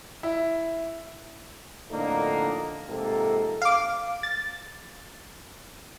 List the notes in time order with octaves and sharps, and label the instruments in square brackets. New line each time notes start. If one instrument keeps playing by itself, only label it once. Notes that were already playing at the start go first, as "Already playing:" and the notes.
[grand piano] E4
[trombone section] F2 A2 D3 A#3 D4 D#4
F2 G#2 C3 A#3 A4
[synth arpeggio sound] F5 D6
A6